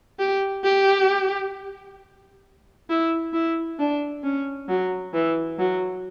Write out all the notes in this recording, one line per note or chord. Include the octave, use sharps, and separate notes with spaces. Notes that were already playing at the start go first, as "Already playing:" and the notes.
G4
G4
E4
E4
D4
C#4
F#3
E3
F#3